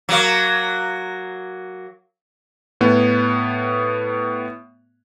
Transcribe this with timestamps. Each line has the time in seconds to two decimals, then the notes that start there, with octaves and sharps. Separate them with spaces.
0.09 F#3 A#3
2.81 A2 B3